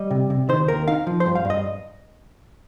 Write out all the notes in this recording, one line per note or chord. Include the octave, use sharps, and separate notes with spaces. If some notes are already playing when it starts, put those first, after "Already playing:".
Already playing: G3 D#5
C3
C3
D#3 C5
D#2 A#4
D#4 F5
F3
C5
G2
F5
G2
D#5